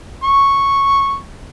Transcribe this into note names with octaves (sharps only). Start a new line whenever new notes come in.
C#6